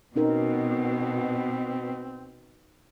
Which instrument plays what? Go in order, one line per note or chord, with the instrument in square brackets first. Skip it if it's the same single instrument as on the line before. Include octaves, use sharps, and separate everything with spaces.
[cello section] B2 [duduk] C4 [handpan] C#4 D#4 A#4